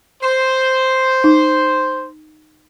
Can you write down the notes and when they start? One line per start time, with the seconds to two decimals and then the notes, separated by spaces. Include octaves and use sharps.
0.22 C5
1.24 D#4